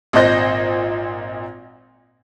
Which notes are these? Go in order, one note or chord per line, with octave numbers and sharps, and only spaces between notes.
G#1 A#2 C5 D#5 G6 A#6